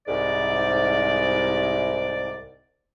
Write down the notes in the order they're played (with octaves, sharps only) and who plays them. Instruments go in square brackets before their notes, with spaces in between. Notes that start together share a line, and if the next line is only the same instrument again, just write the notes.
[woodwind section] C2 G#2 D5